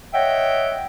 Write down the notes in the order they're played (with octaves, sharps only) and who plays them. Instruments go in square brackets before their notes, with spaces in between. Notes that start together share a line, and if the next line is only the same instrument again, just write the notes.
[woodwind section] C#5 D#5 E5 F#5 G5